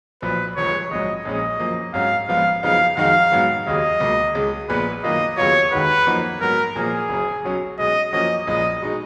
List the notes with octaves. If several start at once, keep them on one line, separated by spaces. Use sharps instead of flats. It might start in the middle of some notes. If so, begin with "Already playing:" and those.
B1 A#2 F3 B4
F1 F2 C#3 F3 G#3 C#5
A#1 G#2 F#3 D#5
A#1 A#2 G#3 C#4 D#5
F#2 F3 A#3
G#2 F#3 C#4 F#4 F5
A#1 G#2 F3 B3 F4 F5
F#2 C#3 F3 B3 D#4 F5
F2 D#3 G#3 D#4 F#4 F5
G#2 F#3 B3 F#4
D#2 C#3 F#3 D#5
C#2 B2 A#3
C#2 C#3 G#3
A#1 A#2 G#3 B3 B4
F#2 D#3 A#3 F4 D#5
D#2 C#3 F#3 B3 F4 C#5
D#2 D#3 G#3 D#4 F#4 B4
F#2 F3 A#3 D#4 F#4
G#2 F#3 B3 F#4 A#4
A#2 F3 A#3 G#4
F#1 F#2 C#3
B1 B2 F#3 C#4
B1 B2 G#3 D#5
F#2 F3 A#3 C#4 F#4 D#5
A#1 A#2 G#3 D#5
B2 G#3 D#4